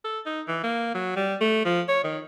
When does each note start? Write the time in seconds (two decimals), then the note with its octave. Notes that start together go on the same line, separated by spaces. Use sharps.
0.05 A4
0.26 D#4
0.48 E3
0.64 A#3
0.94 F#3
1.16 G3
1.41 A3
1.65 F3
1.88 C#5
2.04 D#3